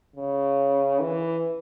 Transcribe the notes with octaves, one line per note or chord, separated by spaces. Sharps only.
C#3
E3